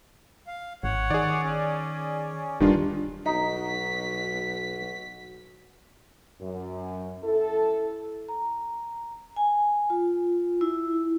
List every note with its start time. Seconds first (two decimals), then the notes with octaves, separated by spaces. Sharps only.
0.47 F5
0.83 G#1 C#5 F#5
1.10 D#3 G#4 D5
1.43 C#4
2.60 D#1 G2 D#3 D4 F4
3.26 B1 D#4 F#4 B6
6.41 F#2
7.24 E4 A4
8.29 A#5
9.36 G#5
9.90 F4
10.61 E4